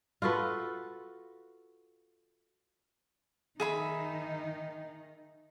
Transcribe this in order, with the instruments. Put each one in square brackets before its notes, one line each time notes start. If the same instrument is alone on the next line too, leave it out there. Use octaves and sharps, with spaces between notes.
[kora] F4 F#4 A4 B4
[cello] D#3 D#4 [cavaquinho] G#4 E5 B5